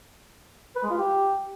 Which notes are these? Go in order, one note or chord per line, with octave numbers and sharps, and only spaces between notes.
B4
G#3
F4
G4